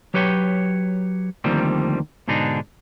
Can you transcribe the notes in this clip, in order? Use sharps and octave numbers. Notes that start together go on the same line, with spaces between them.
F#3 G4 B4 C#5 G5
D2 D#3 F3 G3 A#3 C4
G#2 B2 D3 D4 D#4 G#4